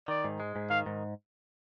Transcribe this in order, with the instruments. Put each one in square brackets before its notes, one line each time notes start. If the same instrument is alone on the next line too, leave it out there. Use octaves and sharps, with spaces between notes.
[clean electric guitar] D#3 [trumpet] D5
[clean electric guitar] G#2
G#3
G#2
[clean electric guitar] D#3 [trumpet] F5
[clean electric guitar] G#2